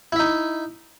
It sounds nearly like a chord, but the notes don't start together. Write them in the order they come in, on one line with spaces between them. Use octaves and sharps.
E4 E5 D#4